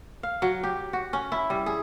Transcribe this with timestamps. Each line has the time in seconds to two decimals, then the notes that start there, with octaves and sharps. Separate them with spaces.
0.23 F5
0.42 F#3
0.63 G4
0.93 F#4
1.13 C#4
1.32 E4
1.50 G3
1.66 G#4